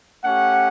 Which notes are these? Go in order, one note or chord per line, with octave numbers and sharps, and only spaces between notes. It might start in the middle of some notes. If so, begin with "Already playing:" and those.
A3 C#4 G4 F#5